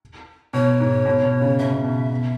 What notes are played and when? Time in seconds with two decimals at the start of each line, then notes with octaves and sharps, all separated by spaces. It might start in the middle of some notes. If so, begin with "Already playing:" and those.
0.53 B2 C#5
0.80 G#2
1.06 B2
1.23 B2
1.41 C#3
1.59 B2 E5
1.72 B2
1.84 B2
2.11 B2